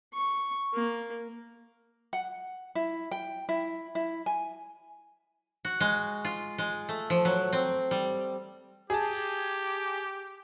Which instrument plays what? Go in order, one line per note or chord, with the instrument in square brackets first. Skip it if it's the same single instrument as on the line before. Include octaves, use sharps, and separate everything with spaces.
[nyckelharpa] C#6
A#3
[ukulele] F#5
E4
G5
E4
E4
G#5
[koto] F#4
G#3
F4
G#3
A3
F3
F#3
C4
G3
[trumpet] G4 [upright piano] G#4 A5